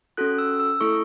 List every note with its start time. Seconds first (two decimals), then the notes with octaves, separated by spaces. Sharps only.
0.17 C#4 F#4 A4 F#6
0.38 E6
0.60 E6
0.80 A3 E4 A4 C#6